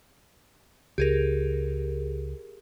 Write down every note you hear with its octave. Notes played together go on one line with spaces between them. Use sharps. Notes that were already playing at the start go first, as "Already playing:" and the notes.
C#2 G4 G#4 A#4